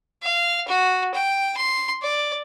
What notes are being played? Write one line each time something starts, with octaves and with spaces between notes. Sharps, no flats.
F5
F#4
G5
C6
D5